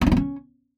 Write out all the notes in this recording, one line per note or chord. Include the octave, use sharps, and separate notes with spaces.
B3
D4
B3
C#4